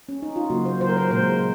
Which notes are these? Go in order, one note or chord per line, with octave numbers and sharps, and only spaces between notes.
C#4
D#4
F4
C#3 F#3 A#3 F#4
C5
C#3 F#3 A#3 C5
A#4
C5
A#2 G#3 C5